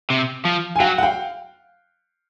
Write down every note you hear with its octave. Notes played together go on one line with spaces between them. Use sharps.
C3
F3
G#5
F#3 F5 G5
F#5
F5 G5